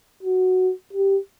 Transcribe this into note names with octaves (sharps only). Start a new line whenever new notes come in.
F#4
G4